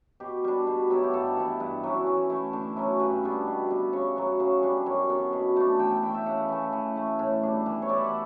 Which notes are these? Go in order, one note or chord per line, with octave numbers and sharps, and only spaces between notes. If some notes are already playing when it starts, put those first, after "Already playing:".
B2 G4
G3 D4
B2
F#3 B3 E4
G4
G2 A4
E3 B3 E4
G2
F#3 C#4 E4
E3
A3 E4
D3
F#3 C#4 E4
G2 B4
D3 G3 B3
B2
G3 B3
C#3 C#5
F#3 B3
C#3
G3 D4
F#2 C#5
D3 F#3 B3
B2
A3 D4
E3 G5
G5
A3 E4 G5
E5
C#3 F#5
E3 A3
E3
A3 E4
A2
G3 D4
E3
C#5
A3 E4 D5
E5
F#5